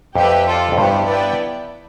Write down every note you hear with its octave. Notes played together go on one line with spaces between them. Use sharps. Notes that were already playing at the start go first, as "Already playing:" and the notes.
F2 G4 B4 E5 G5
F4 A4 D5
F2
G2 B3 E4 G4 C5
B3 E4 B4 D5 G5